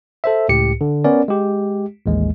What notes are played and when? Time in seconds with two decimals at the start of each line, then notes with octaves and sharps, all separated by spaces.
0.24 A4 C5 E5
0.49 C#2 A2 G4 C#7
0.81 D3
1.04 B3 C#4 A#4 D5
1.28 G#3 G4
2.06 A1 D#2 G#3